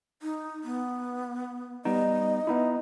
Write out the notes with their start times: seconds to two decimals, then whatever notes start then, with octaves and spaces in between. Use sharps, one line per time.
0.22 D#4
0.64 B3
1.85 G3 B3 D#4 D#5
2.47 B3 D#4 E4